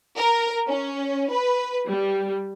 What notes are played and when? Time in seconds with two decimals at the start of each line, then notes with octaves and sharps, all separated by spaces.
0.17 A#4
0.69 C#4
1.31 B4
1.88 G3